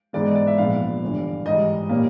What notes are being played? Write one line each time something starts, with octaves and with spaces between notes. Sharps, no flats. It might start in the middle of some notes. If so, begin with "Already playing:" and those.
G#2 E3 G#3 B3 D5
D#5
D5
E5
A#1 A#2 F3 G#3 B3 F5
G1 G2 E3
G#2 E3 G3 D#5
A#2 G3 A#3 C#4